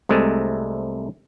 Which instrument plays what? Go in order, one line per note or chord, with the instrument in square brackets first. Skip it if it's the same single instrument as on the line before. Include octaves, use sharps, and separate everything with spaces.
[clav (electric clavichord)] C2 C3 G#3 A3